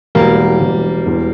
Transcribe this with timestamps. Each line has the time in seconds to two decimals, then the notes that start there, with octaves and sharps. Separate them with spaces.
0.15 E1 G3 A#3
0.61 E1
1.06 E2